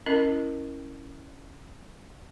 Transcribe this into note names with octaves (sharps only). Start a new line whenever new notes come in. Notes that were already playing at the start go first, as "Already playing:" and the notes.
C#4 E4 A#4 D#5